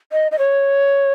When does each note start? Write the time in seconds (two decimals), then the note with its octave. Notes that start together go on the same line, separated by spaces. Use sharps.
0.12 D#5
0.32 D#5
0.39 C#5